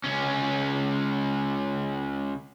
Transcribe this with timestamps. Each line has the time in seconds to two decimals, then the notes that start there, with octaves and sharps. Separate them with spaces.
0.05 C#2 C#4